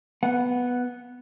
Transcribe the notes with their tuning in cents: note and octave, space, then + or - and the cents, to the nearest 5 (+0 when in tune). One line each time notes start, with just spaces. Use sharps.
B3 +0 F#5 -15